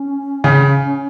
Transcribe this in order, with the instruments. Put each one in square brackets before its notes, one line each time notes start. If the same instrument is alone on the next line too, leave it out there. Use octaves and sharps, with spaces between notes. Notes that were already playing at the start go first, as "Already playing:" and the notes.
Already playing: [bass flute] C#4
[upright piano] C#3